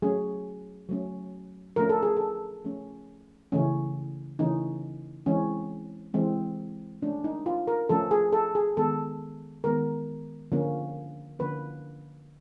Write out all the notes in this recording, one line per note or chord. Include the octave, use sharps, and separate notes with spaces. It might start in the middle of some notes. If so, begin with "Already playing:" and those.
F#3 A3 C#4 G#4
F#3 A3 C#4
F3 A3 C#4 A#4
A4
G#4
A4
F3 A3 C#4
C#3 E3 A3 C#4
C#3 E3 A3 C#4 D#4
E3 G#3 C4 C#4
E3 G#3 C4
F3 A3 C#4 D4
D#4
F4
A#4
F3 A3 C#4 A4
G#4
A4
G#4
D#3 G#3 B3 A4
D#3 G#3 B3 A#4
D3 F3 A#3 C#4
D3 F3 A#3 C#4 B4